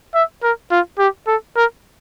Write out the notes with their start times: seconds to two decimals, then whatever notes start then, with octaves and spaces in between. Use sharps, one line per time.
0.14 E5
0.43 A#4
0.71 F4
0.99 G4
1.27 A4
1.56 A#4